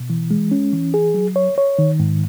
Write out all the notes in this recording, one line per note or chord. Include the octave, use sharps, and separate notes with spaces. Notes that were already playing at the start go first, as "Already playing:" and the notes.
Already playing: B2
E3
G#3
C#4
E3
G#4
F#3
C#5
C#5
D#3
G#2